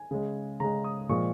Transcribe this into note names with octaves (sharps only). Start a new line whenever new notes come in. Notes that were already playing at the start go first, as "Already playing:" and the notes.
Already playing: G#5
C#3 G#3
C#3 G#3 A#5
D#6
A#2 F3 G#3 C#6